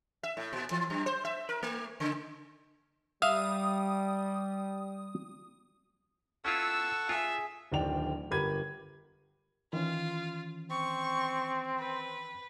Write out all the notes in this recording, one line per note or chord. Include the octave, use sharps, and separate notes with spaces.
E5
A2
A#2
E3
F#2
C5
E5
A#4
A3
C#3
G3 E5 F5 D#6
C#4 E4 F4 A4 F#5 C#6 E6
F4 G#4 E5
D1 D2 D#3 D4 G5 F7
G1 G4 A#4 B5 G#6 D#7
D#3 E3 C#4 F4
C4 C#6
B4